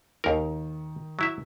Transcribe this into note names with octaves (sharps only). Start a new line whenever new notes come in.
D#2 D#3 A#4
F#3 E4 E5